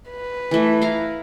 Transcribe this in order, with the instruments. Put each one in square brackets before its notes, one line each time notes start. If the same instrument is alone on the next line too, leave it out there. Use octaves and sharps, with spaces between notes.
[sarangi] B4
[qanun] E3 A3
E4 F5 A#5